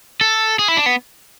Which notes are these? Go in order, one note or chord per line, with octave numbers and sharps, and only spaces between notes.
A4
G#4
E4
D4
B3